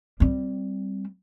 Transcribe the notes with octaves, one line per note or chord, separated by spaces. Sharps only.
G3 C4